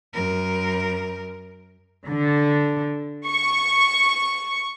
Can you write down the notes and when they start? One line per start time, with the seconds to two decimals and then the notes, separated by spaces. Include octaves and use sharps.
0.13 F#2 A#4
2.06 D3
3.27 C#6